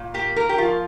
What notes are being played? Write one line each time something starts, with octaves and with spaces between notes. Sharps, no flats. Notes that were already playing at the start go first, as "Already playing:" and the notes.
Already playing: A#2
A#3 G4
A#3 A#4
G4
F3 F4